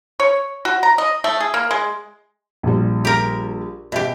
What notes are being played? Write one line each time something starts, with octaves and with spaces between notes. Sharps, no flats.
C#5
F#4
A#5
D#5
A3
G#4
A#3
G#3
A#1 G3
G4 A#4
B2 G4 E5 G5